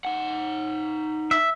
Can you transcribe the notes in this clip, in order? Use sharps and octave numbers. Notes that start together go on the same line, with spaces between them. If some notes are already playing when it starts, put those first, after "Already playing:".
D#4 F#5
E5